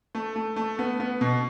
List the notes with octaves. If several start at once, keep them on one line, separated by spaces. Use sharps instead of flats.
A3
A3
A3
B3
B3
B2